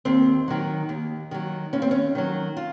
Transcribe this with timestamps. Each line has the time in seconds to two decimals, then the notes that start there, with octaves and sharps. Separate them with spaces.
0.05 D#2 C4
0.48 D#3 F#3
0.89 D#2
1.31 D#3 F#3
1.73 D#2 C#4
1.82 C4
1.91 C#4
2.15 D#3 F#3
2.57 F4